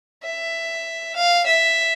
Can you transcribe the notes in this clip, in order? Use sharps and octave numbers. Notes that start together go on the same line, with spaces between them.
E5
F5
E5